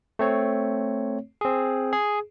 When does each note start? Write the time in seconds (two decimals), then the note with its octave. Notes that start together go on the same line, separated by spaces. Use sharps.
0.19 A3 C4 C#5
1.41 C4 G#4
1.93 G#4